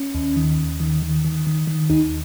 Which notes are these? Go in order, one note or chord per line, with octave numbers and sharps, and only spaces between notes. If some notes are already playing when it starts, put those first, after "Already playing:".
Already playing: C#4
D#2
D#3
D#2
D#3
D#3
D#3
D#3
D#3
D#2 D#4